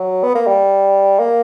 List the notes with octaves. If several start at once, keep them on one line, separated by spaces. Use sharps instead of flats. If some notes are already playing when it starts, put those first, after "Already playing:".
Already playing: F#3
B3
A#3
G3
A#3